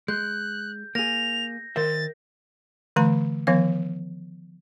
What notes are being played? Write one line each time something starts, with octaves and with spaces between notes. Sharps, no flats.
G#3 F#6 G6
A#3 G#4 A#6 F7
D#3 A#4 C5 E5 A6
D3 E3 A3 A#5 B5
D#3 F3 B3 F5